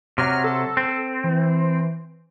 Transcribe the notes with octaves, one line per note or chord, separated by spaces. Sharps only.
C3 F#3 F6
A4
C4
E3